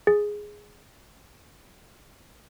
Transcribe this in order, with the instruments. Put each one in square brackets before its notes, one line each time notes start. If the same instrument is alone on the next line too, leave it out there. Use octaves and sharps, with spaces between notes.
[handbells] G#4 A6